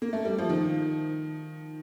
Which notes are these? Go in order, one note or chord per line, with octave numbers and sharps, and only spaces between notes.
A#3
A3
G3
F3
D#3